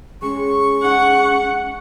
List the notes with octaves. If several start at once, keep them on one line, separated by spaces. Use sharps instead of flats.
G#3 C#4 C#6
D#4 G#4 F#5